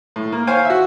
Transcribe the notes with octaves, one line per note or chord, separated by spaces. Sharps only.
A2
A#3
C5 C#5 F5 G5 G#5
F#4 E5